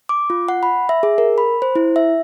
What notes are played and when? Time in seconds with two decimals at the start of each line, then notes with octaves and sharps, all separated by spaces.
0.09 D6
0.30 F4
0.49 F#5
0.63 B5
0.89 E5
1.03 G#4
1.18 A#4
1.38 B5
1.62 C5
1.75 E4
1.96 E5